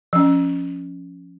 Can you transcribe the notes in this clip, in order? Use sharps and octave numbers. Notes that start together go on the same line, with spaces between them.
F3 C#4